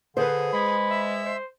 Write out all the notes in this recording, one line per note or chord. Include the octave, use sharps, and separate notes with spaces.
D3 G#4 B4 C5
G#3 B5
E5
C5